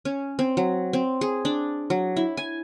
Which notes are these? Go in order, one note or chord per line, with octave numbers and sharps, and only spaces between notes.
C#4
C4
F#3
C4
G#4
D4
F#3
E4
G#5